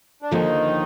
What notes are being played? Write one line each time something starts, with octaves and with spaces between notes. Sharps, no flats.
D4
D#2 D3 D#3 F3 A#3 D#4